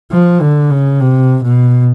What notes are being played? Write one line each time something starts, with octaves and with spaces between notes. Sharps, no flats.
F3
D3
C#3
C3
B2